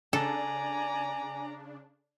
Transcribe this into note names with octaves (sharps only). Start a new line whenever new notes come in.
C#3 D4 A4 D5 G#5 A#5